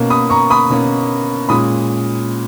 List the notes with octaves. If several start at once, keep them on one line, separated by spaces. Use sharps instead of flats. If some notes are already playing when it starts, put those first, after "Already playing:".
Already playing: B2 A#3 C#4
B5 D#6
A#5 C#6
B5 D#6
B2 A#3 C#4
A#2 G#3 C#4 B5 D#6